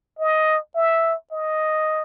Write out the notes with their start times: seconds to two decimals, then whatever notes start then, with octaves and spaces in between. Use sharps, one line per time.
0.19 D#5
0.75 E5
1.32 D#5